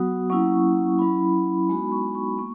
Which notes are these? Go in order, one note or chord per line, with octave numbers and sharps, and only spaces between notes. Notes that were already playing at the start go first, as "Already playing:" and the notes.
Already playing: F#3 B3 F#4 D#6
F#3 A#3 C#4 E4 C#6
F#3 C#4 E4 B5
G#3 B3 D#4 F#4 B5
C#6
C#6
A#3 C#6